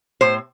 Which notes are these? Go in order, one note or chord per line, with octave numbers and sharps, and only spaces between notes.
A2 C5